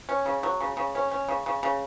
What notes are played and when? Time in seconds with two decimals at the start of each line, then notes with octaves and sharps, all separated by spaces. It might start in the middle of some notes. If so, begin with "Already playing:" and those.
0.09 C#4
0.26 C#3
0.43 F#3
0.61 C#3
0.77 C#3
0.95 C#4
1.11 C#4
1.29 C#3
1.46 C#3
1.63 C#3